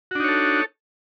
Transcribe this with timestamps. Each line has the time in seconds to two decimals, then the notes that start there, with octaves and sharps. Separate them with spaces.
0.11 F#4
0.15 D4
0.20 D#4
0.24 C#5
0.28 A4